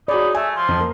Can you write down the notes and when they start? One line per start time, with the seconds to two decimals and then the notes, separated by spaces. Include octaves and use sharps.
0.08 D#4 F#4 G#4 C#5 D5 B5
0.35 A3 E5 G#5
0.56 F3 C6
0.68 F2
0.80 A#3